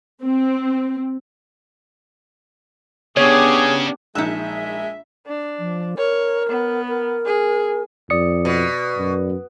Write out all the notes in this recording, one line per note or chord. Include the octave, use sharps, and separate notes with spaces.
C4
C#3 B3 D4 G4 G#4 C#5
A#1 G#3 D#4 E5 A5 E6 F#6
D4
F3
A#4 C#5
B3
A#4
G#4
F2 D5 D#6 C#7
B2
F#2